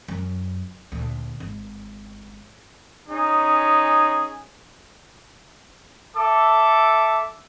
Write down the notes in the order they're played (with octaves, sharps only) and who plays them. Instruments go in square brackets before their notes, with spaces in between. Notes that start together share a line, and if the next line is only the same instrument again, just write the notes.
[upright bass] F#2
D2 A#2
G#1
[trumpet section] C#4 D#4 G#4
A4 E5 D6